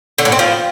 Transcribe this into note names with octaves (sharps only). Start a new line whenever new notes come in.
D3
A2
C4
F3